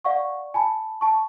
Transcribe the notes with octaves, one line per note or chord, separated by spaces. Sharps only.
D5 F5 F#5 C#6
G#5 A5 B5
A5 C#6